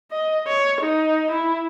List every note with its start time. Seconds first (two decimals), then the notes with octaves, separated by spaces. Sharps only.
0.11 D#5
0.48 C#5
0.81 D#4
1.31 E4